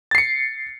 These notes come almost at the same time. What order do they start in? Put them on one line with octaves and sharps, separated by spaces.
A6 C7 C#7